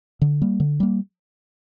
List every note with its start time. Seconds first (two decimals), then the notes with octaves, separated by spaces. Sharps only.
0.22 D3
0.42 G3 A#3
0.60 D3
0.80 G3 A#3